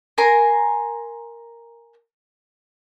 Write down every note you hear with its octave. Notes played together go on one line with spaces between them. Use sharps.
A#4 G#5 A#5 C6